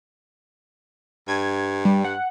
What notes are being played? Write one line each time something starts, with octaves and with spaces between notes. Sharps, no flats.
G2 G#6
G3
F#5